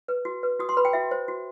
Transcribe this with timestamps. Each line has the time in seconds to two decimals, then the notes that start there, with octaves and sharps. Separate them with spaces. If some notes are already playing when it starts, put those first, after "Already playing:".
0.08 B4
0.25 F#4
0.43 B4
0.59 F#4 D#6
0.69 C6
0.77 B4 B5
0.85 G5
0.93 F#4 E5
1.11 C5
1.28 F#4